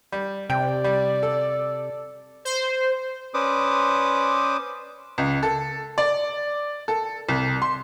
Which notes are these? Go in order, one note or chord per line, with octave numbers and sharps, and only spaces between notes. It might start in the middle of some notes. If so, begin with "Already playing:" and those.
G3
C3 D5 G5
G3
A4
C5
C#4 B4 C5 D5 D6 D#6
C#2
A4
D5
A4
C2
C6